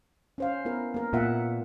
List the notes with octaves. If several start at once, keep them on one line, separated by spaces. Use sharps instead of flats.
C#4 C5 F5
B3 E4 A#4
A#3 A#4
A#2 B3 E5 F#5